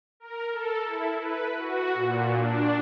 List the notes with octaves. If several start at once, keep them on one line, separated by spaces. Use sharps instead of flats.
A#4
A4
E4
B4
F#4
A#2
D4